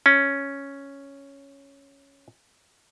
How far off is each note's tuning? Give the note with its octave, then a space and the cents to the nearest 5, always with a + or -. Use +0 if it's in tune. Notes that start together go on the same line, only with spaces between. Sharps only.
C#4 +0